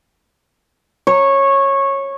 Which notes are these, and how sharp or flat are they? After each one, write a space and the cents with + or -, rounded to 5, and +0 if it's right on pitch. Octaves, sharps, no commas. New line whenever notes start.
C#5 -15